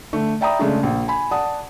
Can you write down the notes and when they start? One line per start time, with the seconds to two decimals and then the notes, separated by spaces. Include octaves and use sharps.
0.13 D3 A3
0.41 D5 E5 G5 A#5 B5 D#6
0.59 C#3 G#3 A3 D4
0.83 A#1
1.08 G#5 B5
1.31 D5 F#5 A5 D#6